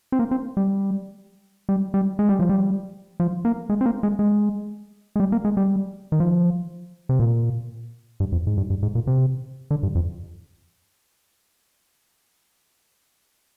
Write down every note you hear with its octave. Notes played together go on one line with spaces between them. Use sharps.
C4
A#3
C4
G3
G3
G3
G#3
G3
F3
G3
F3
A#3
G#3
C4
A#3
G#3
G#3
G#3
G3
A#3
G#3
G3
D#3
F3
C3
A#2
G2
F2
G#2
G2
G2
G#2
A#2
C3
D3
G2
F2